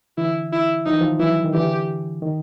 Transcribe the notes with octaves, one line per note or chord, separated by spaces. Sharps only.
D3 E3 E4
E4
F3 D#4
E3
D#3 F3
E3 F#3 E4
D#3
D3 E3 G4
D#3